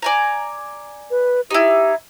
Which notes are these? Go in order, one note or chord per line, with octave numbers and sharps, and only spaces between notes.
D5 G#5 A#5
B4
D#4 E4 G4